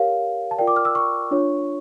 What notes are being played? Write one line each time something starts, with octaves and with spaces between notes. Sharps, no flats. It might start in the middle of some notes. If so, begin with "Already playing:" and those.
Already playing: G4 A#4 C#5 F5
A5
F4 A#4 D5 G5
D6
F6
E6
C#6
D4 F4 C#5